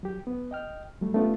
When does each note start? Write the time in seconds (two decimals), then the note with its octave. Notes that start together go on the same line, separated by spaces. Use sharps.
0.03 F#3 G4
0.27 B3
0.51 D#5 G5 F6
1.01 F#3 G3 A3
1.14 A3 B3 C#4 D4 F4 G4